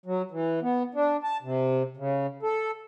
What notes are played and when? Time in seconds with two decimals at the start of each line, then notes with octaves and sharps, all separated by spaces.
0.06 F#3
0.31 E3
0.62 B3
0.94 D4
1.24 A5
1.43 C3
1.97 C#3
2.43 A4